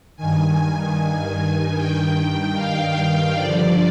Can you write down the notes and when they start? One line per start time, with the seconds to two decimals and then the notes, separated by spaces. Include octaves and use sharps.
0.16 G2 D#3 G#5
1.75 G2 D#3 G5
2.54 F5
3.33 G2 D3 F3 D5